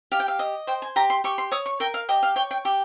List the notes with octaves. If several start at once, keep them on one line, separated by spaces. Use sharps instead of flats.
G4 F5
G5
F5
D#5
C5 G5
G#5
G4 A#5
C6
G4 C#6
C6
C#5 D#6
C#6
A#4 G5
F5
G4 D#5
F5
C#5 G5
G5
G4